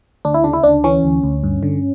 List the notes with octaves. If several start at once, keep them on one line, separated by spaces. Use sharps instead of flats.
D2 D4
E4
C#3 D4
E4
D2 D4
E3 C#4
D2
D2
G2
D3